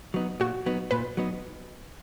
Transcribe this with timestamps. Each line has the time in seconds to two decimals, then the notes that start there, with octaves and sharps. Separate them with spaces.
0.14 F#3 B3 D#4
0.40 A#2 F#4
0.66 F#3 B3 D#4
0.91 A#2 B4
1.17 F#3 B3 D#4